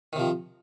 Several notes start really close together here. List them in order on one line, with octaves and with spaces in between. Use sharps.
D#3 C3 F3